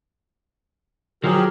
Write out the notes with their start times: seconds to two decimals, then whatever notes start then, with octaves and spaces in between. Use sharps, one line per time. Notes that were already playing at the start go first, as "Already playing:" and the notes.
1.24 F3 F#3 G4 G#4 A#4